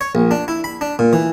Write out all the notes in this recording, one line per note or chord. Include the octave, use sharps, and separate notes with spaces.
C#5
A#1
D4
E4
B5
D4
A#2
E3